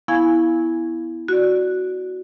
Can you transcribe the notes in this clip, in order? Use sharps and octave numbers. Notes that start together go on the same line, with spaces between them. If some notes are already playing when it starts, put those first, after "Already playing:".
B3 E4 F5 G#5 C#6 G#6
F#4 D5